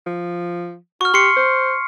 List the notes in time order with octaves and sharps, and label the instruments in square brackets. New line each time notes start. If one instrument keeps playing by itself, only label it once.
[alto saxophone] F3
[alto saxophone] F#4 [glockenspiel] C#6 F6
[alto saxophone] G4 [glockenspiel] C6 C7 C#7
[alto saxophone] C5